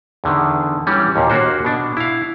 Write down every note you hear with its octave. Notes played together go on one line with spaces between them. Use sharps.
E2 D3 D#3
E3 G3 C#4
D#2 A#2
A#3 D4 F#4 G4 C5
B2 D4
E4 F5